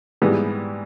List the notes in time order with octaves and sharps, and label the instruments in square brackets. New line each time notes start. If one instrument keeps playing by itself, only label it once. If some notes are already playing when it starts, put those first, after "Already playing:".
[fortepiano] G#2 E3 G3 B3